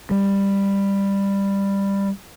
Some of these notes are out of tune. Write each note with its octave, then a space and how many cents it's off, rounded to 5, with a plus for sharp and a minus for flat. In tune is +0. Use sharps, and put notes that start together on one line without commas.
G3 +15